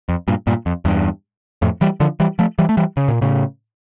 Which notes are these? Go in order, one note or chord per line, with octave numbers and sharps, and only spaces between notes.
F2
G2 A#2
G2 A#2
F2
E2 G2
F2 A2
E3 G3
D3 F3
E3 G3
F3 A3
E3 G3
A3
E3 G3
C#3
A#2
A2 C#3